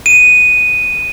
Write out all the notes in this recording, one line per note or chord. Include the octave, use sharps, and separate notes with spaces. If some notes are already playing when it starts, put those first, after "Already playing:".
D#7